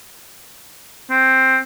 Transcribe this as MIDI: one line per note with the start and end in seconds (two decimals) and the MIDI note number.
1.10 1.58 60